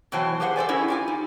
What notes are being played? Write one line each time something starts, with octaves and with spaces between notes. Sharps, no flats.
B2 E3 F#3 C5 G5 A5
G4 G#4 C5 E5 F#5
A4 C5 D5 G#5
C#4 E4 G#4 A#4
F4 G4 G#5
D#4